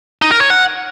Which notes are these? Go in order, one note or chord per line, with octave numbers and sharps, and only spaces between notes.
D#4
A#4
C#5
F#5